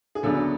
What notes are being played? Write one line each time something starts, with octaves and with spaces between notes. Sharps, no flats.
G#4
D2 C#3 F#3 B3 D4 A4